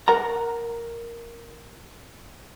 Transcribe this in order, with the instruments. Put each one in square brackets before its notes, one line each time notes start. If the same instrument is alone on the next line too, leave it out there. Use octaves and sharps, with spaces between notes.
[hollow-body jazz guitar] A#4 F#5 A#5